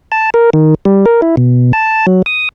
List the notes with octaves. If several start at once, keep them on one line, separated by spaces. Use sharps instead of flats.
A5
A#4
D#3
G3
A#4
E4
B2
A5
F#3
D#6